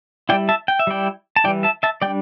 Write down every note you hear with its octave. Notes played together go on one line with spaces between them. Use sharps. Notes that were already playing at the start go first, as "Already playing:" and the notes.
G3 E4 D5 G5
E5 A5
G5
E5
G3 E4 D5 G5
A5
E3 G3 E4 D5 G5
E5 A5
E5 A5
G3 D4 D5 G5